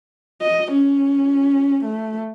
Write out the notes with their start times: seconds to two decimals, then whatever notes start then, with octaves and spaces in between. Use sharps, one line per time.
0.41 D#5
0.71 C#4
1.84 A3